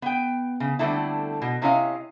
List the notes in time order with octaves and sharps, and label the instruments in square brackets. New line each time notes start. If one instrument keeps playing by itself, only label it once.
[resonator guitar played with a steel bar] B3 G5
C#3
D3 G3 A3 C4 D4 E4
B2
C3 C#4 E4 C#5 D#5 F5